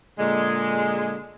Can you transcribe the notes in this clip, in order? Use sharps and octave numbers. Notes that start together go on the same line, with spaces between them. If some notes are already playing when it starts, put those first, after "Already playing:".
A#2 D3 G#3